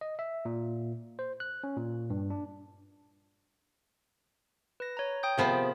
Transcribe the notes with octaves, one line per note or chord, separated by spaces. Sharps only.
D#5
E5
A#2
C5
F#6
C#4
A#2
G2
D4
B4 A#6
C#5 A#5
G5 D#6 G6
C3 F3 B3 G#4 A#4 B5